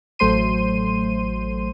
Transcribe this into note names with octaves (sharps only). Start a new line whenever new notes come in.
A1 F#3 A3 C5 C6 D#7